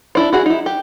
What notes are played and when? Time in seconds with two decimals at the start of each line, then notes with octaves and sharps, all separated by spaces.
0.15 D4 E4 C5
0.33 E4 F#4 G#4
0.46 D#4 E4
0.66 G4